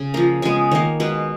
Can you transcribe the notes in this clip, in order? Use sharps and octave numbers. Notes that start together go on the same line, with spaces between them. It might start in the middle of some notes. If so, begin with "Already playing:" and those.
Already playing: C#3
F3 A#3 A#5
C#3 G#3 B3 G#5
D#3 A#3 C#5
B2 G#3 B3 B4